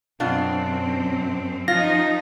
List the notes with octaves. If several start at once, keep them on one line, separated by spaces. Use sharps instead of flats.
F#2 B2 C4 D4 F4
F3 D#4 F4 A#6